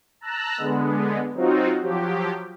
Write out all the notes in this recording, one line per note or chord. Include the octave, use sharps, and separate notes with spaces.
A5 A#5 E6 F#6
D3 G#3 B3
F#3 C4 D#4 F4 F#4
F3 F#3 G4